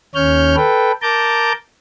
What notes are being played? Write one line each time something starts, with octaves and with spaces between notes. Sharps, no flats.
D#2 C#4 C#5 F6 G6
A4 B4 G5
A#4 A5 A#5 D6 G6